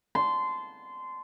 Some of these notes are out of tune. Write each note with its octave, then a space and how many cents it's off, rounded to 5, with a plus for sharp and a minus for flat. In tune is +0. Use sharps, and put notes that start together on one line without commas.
A5 -20 C6 -20